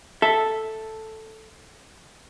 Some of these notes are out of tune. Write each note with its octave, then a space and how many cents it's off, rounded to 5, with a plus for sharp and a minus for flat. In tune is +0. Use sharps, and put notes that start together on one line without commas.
A4 +0 E5 -5